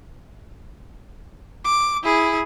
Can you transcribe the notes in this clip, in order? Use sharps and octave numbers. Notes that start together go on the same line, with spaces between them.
D6
E4 G#4